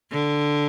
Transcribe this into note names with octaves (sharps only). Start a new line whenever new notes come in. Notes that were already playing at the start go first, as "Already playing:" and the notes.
D3